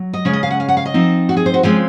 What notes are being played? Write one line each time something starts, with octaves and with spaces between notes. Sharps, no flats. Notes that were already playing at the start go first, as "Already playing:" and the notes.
Already playing: F#3
D#5
C#3 G#3 C#4 C#5
D#5
F5
F#5
F5
F#5
F5
D#5
F3 C4 D#4
F#4
G#4
C5
F#4
C#3 F3 G#3 C4 F4